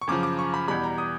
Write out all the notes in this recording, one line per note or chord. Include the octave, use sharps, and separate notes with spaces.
C#6
F#2 C#3 F3 D6
D6
C#6
B5
E2 B2 G3 B5
A#5
D#6